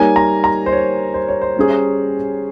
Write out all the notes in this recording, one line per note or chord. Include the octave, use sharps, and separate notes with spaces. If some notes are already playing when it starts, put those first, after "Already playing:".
Already playing: G3 A#3 D#4 A#4 C#5 G#5
A#5
A#5
C5
C#5
C5
C#5
C5
G3 C#4 G#4